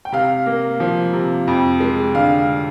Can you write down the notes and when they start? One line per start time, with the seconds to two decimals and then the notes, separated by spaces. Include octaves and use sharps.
0.05 G5
0.12 C3 F5
0.46 A#3
0.80 F3
1.13 C3
1.48 F2
1.80 G#3
2.14 D3 F5